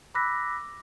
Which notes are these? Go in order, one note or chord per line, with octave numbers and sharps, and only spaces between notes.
B5 D6 E6 F#6 A#6 B6